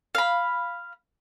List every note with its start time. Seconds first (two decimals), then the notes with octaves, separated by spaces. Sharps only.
0.15 F5 B5